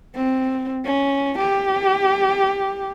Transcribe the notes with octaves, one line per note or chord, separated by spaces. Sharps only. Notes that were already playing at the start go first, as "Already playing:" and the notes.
C4
C#4
G4